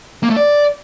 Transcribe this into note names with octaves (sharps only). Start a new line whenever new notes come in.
A#3
A3
D5